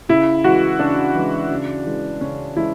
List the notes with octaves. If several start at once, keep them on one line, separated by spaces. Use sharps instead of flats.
C#3 E4
E3 G#3 F#4
C#3 D4
E3 G#3
C#3
E3 G#3
C#3 C#4
E3 G#3 E4